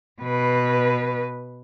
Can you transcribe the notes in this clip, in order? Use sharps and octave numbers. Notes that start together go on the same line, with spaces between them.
B2 B4